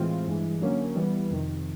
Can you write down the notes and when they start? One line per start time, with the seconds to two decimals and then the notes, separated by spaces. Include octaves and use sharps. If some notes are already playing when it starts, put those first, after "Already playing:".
Already playing: A2 E3 G#3 C4 F4
0.28 G2 E3 G#3
0.61 D3 F#3 A#3 C#4
0.95 E3 G3 B3
1.30 F2 C3 D#3